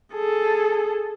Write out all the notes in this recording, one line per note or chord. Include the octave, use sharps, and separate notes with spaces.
G#4 A4